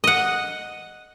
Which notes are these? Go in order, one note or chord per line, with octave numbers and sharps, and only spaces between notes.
D#5 F#5